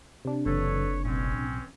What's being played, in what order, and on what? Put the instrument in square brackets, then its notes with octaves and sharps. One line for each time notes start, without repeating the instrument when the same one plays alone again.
[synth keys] C3 D4
[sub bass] F#1 [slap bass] F#2 C#3 E3 [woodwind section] A4 B4 C#5
[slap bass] B1 A2 [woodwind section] E3 C4 C#4